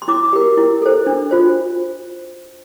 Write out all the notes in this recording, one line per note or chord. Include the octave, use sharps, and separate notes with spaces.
C6
E4 D6
G4 A#4
E4
A4 C5
D4
F4 C5